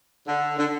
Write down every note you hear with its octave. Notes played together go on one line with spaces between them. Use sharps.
D3
D3